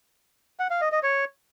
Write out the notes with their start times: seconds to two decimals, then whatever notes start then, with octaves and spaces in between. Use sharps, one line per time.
0.60 F#5
0.70 F5
0.81 D#5
0.92 D#5
1.03 C#5